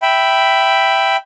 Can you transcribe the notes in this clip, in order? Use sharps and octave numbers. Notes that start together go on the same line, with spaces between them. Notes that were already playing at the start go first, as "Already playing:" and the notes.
E5 G5 B5